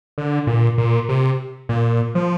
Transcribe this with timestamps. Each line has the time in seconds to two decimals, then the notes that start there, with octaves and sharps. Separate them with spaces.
0.18 D3
0.47 A#2
0.78 A#2
1.09 C3
1.69 A#2
2.15 F3